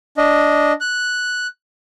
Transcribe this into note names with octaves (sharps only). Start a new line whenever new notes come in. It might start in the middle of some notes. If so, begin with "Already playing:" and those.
D4 D#5
F#6